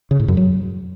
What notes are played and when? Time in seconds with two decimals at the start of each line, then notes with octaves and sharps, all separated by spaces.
0.11 C#3
0.20 A2
0.28 F#2
0.37 F#3